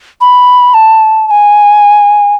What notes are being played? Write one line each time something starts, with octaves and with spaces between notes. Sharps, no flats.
B5
A5
A5
G#5